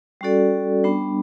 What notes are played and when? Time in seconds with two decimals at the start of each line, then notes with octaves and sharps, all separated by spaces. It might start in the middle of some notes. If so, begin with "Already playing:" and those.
0.21 G3 C#4 F#4 A4 D5
0.84 G3 B3 D4